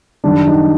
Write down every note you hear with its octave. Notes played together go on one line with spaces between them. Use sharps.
F#2 D#3 G3 D4
D#4